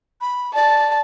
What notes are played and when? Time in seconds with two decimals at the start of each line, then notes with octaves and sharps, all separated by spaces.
0.21 B5
0.55 D5 A5